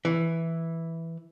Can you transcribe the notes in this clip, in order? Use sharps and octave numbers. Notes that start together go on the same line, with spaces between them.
E3